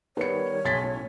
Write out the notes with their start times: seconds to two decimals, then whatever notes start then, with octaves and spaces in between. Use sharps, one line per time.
0.17 D#3 G3 B3 C#5 C#7
0.65 B1 G#4 C6 A6 B6
0.83 A2 C#4